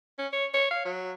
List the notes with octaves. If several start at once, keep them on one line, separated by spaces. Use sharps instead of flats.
C#4
C#5
C#5
F5
F#3